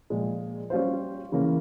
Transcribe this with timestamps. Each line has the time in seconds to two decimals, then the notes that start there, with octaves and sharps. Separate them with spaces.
0.10 A#2 F3 G#3
0.70 G3 C#4 F4 C5
1.32 C#3 E3 A#3 C#4